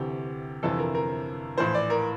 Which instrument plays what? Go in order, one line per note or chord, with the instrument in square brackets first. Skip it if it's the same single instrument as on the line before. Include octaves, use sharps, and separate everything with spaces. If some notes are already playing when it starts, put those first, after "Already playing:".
Already playing: [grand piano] D2 C3 E3 G4
G1 F2 C3 E3 A4
A#4
A#4
A#1 A2 E3 C5
D5
A#4